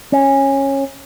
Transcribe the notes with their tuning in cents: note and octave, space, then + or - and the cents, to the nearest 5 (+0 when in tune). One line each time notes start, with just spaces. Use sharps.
C#4 -15